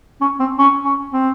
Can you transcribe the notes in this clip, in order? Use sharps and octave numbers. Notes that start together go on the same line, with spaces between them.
C#4
C4
C#4
C#4
C4